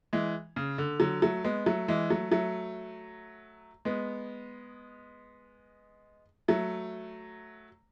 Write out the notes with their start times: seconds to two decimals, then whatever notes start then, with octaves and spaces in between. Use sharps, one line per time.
0.13 E3 G#3
0.56 C#3
0.78 D3
1.00 D3 F#3
1.22 F#3 A3
1.44 G#3 B3
1.66 F#3 A3
1.88 E3 G#3
2.10 F#3 A3
2.32 F#3 A3
3.85 G#3 B3
6.48 F#3 A3